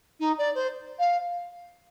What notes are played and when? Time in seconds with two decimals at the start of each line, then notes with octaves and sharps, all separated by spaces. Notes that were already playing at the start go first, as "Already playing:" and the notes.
0.20 D#4
0.38 D5
0.55 C5
0.99 F5